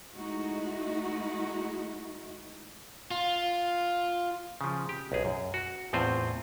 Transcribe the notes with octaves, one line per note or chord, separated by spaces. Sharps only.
G#3 A3 D#4 E4 F#4
F4
C#3 F3
G4
B1 G#4
F#2
F#4
E2 A2 C4 F4 C5